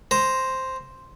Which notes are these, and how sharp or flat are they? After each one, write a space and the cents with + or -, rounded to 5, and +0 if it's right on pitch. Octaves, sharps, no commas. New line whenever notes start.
C5 +0 A#5 +0